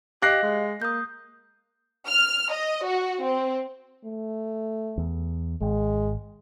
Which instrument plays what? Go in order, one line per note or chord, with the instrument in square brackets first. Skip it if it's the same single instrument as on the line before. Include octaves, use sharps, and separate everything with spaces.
[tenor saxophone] G4 [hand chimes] D#5 F5 [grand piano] F#6 A#6 C7
[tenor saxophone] G#3
[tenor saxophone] A#3 [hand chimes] D#6 G6
[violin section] F6
D#5
F#4
C4
[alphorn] A3
[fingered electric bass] E2
[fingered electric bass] G#1 [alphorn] G#3